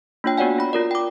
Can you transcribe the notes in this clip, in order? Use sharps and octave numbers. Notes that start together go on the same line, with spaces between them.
A#3 D4 F4 C#5 G5
B3 F#4 C#5 D5 F#5 G#5
F4 B5
F4 A#4 D5
G5 D6